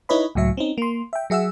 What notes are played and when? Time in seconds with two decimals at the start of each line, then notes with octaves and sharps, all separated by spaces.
0.09 D#4 E4 B4 C#5 D#5 B5
0.35 C#2 A2 F#3 E5
0.57 C4 C#4 D#4
0.78 A#3 C6
1.13 E5 G5
1.30 F#3 G#4 E5 F#5 E6